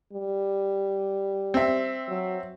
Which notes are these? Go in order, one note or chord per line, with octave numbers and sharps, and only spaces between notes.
G3
C4 E5
F#3